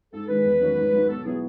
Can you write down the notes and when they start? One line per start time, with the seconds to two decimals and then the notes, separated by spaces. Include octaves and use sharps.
0.13 G#2 A4
0.28 D#3 G#3 B4
0.45 E2
0.61 D#3 F#3 A3 C#4
0.77 G#2
0.93 F#3 A3 D#4
1.09 B2 A4
1.25 F#3 B3 E4 G#4